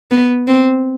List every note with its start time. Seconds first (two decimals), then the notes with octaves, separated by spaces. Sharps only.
0.11 B3
0.47 C4